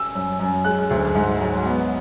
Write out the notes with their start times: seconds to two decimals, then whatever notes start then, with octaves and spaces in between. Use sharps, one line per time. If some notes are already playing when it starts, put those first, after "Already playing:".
Already playing: E6
0.15 F#2
0.40 F#2
0.64 G#3 F#6
0.90 D2
1.15 G#2
1.41 F#3
1.66 B3